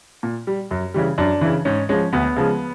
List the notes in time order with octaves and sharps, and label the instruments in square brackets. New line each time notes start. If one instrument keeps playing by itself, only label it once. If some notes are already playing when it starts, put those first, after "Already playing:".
[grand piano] A#2
G3
F#2
C#3 E3 G3
F#2 D4
C#3 E3
G#2 C#4
F3 G#3 C#4
D2 B3
C#3 F3 G#3